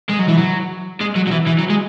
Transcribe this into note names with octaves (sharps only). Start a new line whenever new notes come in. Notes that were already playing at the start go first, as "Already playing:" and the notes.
G#3
F#3
E3
F#3
G#3
F#3
F#3
E3
E3
F#3
G#3